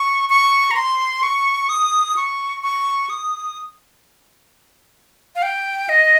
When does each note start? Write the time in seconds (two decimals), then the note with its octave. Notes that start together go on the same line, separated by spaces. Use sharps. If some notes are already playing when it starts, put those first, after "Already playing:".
Already playing: C#6
0.29 C#6
0.71 A#5
0.76 C6
1.23 C#6
1.69 D#6
2.17 C#6
2.63 C#6
3.10 D#6
5.36 F5
5.43 G5
5.89 D#5